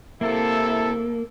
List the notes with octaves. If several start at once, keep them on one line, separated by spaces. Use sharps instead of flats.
C3 A#3 E4 A4